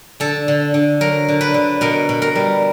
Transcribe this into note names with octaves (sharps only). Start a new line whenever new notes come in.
D3 A4
D3
D3
F#3 A#4
D3
B4
D3
B2 A#4
B2
A#4
G3